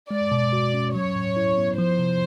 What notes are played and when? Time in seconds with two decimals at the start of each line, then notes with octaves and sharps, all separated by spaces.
0.11 G#3 D5
0.32 B2
0.53 F#4
0.74 C#4
0.94 F#3 C#5
1.16 A2
1.36 E4
1.57 B3
1.77 F3 C5
1.99 C3